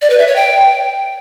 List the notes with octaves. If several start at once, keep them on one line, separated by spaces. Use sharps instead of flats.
D5
B4
E5
C#5
G5